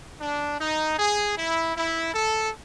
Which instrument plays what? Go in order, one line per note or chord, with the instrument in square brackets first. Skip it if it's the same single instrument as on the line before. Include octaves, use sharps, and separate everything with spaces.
[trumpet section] D4
D#4
G#4
E4
E4
A4